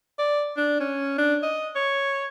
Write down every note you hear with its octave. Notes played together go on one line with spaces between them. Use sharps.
D5
D4
C#4
D4
D#5
C#5